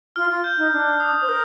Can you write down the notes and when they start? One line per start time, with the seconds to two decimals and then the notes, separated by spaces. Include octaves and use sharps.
0.16 F4 F6
0.30 F4
0.44 G6
0.58 D#4
0.73 D4
1.00 D#6
1.15 D#6
1.21 C5
1.29 A#4